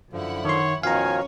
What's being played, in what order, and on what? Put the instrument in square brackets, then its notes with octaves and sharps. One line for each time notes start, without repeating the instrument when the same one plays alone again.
[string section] F#2 E4 F#5 [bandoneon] D3 F3
[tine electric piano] D#3 C6 [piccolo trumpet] C#5
[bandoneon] B2 D#3 F3 [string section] C#4 C#5 [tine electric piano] F5 A#5 [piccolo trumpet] G#5